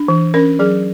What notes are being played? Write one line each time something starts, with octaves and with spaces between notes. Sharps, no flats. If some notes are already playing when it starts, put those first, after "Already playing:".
Already playing: D4
E3
C#4 A#4
F#3 G#4